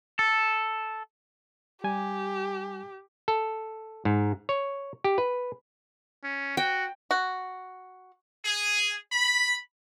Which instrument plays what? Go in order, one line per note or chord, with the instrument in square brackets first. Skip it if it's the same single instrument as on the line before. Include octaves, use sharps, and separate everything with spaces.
[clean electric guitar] A4
[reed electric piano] G3 G#5 [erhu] G4
[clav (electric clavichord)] A4
G#2
C#5
G4
B4
[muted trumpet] C#4
[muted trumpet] F#4 [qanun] G5
[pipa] F#4
[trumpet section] G#4
B5